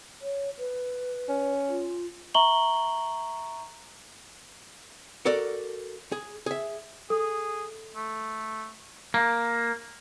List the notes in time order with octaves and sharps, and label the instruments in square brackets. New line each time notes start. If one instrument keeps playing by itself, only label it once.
[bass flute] C#5
B4
[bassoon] C#4
[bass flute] F4
[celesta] E5 A#5 C#6 F#7 G7
[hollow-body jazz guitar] F#4 A4 A#4 D5
G#4
G#4 E5
[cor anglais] G#4 [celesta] A4 D#6
[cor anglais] A3
[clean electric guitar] A#3